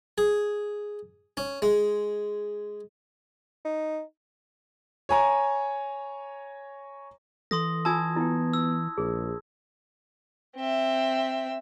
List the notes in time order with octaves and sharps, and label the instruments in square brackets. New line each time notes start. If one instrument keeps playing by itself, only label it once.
[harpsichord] G#4
C#4
G#3
[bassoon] D#4
[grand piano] C#5 G#5 A#5
[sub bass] E3 [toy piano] A4 [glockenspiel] C6 D#6 A#6
[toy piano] F4 G#5 E6 [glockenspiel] A5 D#6 G#6
[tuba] B3 [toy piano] E4 G5
[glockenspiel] E6
[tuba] A#1 [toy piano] G#4
[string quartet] C4 E5